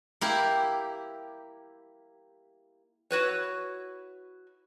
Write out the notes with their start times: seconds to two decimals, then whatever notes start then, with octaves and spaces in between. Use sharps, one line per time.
0.21 A#3 E4 G4
3.11 E4 F#4 B4 C#5